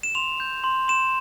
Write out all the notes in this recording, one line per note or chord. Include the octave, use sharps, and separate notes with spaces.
E7
C6 F7
G6
C6
C6 E7